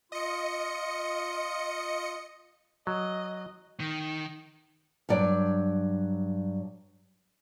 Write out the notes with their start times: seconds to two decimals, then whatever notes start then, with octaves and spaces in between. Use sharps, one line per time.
0.12 F4 D#5 C#7
2.87 F#3 D#5
3.80 D#3
5.09 G2 F#3 D5